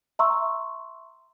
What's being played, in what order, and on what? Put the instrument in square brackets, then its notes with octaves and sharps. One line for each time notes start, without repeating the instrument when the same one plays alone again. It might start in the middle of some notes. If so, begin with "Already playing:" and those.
[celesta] E5 A#5 C6 C#6 E6